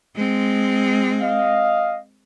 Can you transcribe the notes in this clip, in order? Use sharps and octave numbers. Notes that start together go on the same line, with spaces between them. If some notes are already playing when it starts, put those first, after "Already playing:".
G#3 C4
D#5 F5